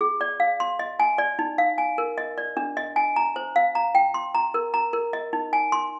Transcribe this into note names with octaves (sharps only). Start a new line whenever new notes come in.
G#4
D5
F5
C6
D#5
G#5
D5
D#4
F5
G#5
A#4
D#5
D5
D4
D#5
G#5
A#5
C5
F5
A#5
G5
C6
A#5
A#4
A#5
A#4
D#5
D#4
G#5
C6